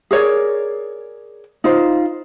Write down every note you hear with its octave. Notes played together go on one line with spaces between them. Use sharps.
G#4 A#4 C#5 D5
D#4 F4 C5